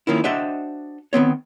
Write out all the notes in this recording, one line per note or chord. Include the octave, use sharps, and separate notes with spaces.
D#3 F3 A#3 C#4 E4
D4 F#4 C5 D#5 E5 G5
D#3 B3 C4 C#5